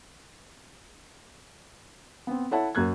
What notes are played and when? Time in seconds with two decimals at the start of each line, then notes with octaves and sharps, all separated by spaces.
2.27 B3 C4
2.51 E4 A4 C#5 E5 F#5 A5
2.75 F#2 A#3 F#6 G#6